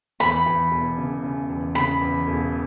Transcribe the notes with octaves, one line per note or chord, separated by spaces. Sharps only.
E2 B5
E2
E1
C#3
C#3
E2
C#3 B5
E2
E1